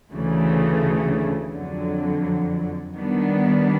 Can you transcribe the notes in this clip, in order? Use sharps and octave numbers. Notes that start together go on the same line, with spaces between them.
D2 C#3 E3 A3
F2 D3 F#3
D#3 G3 B3 D4